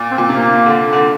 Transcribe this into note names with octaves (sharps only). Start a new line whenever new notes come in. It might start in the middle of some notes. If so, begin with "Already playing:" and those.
Already playing: A#2
C4
A#2
C3 A#3
D3
D3